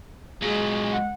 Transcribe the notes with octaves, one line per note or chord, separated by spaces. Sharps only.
A#2 F#3 G#3 G#4
F#5